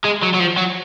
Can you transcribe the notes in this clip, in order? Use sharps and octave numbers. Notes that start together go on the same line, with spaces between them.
G#3
F#3
F#3
F3
F#3